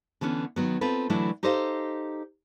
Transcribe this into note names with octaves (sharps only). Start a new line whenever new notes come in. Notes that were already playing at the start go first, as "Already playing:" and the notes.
D3 E3 B3 C#4
D#3 F#3 B3
C4 D#4 F4 A4 B4
D3 E3 F#3 A3 D4 E4
D#4 G4 A4 C5 D#5 F5